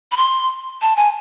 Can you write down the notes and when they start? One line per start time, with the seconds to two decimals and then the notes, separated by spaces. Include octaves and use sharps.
0.12 B5
0.17 C6
0.82 A5
0.96 G#5